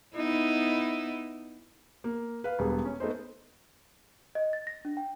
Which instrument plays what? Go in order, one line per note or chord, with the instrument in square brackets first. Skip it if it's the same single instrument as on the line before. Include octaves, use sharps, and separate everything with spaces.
[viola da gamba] B3 D#4 E4
[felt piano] A#3
B4 F5
E1 G3 B3 G#4
C#4
A3 B3 D#4 C5
[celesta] D#5
A6
A#6
D4
G5